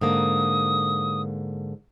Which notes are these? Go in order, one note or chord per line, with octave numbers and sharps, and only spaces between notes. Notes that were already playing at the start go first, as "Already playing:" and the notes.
G#2 D3 A#3 D#6